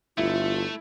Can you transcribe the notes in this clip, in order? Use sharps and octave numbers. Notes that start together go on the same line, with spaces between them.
G1 A3 E4 F4